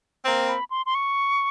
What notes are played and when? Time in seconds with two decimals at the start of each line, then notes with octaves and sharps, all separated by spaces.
0.24 A#3 C4
0.48 B5
0.70 C6
0.86 C6
0.95 C#6